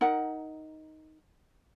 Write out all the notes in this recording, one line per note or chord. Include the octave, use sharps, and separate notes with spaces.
D#4 A#4 F#5